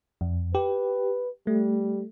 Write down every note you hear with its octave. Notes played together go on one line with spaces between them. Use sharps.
F2
G4 B4
G3 A3